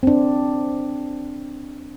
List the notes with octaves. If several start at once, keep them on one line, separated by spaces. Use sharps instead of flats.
C4 D4